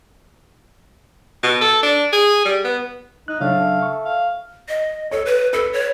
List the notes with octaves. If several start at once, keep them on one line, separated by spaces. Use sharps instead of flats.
B2
A4
D4
G#4
G3
B3
D#4 F#6
A2 C#3 F#3 D4 F5
A3
C#6
F5
D#5
A4 C#5
B4
A4 B4
C#5